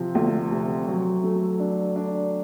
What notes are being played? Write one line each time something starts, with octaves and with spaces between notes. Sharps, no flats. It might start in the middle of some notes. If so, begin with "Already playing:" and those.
Already playing: C3 F3
D2
C3
F#3
A3
D4
D4